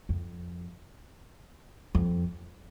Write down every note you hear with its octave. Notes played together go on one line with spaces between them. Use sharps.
F2
F2